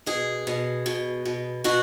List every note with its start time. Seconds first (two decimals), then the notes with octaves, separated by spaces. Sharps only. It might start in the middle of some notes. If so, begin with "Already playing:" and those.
0.06 B2 G#4
0.47 B2
0.86 B2
1.25 B2
1.64 B2 F#4